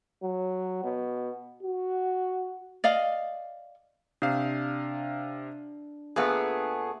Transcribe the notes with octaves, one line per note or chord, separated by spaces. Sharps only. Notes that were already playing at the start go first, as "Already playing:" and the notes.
F#3
B2
F#4
D5 D#5 F5
C3 D4 F5
A#2 A3 B3 G#4